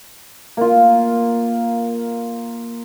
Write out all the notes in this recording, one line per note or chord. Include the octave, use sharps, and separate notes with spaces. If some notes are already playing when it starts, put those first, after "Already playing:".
A#3 F4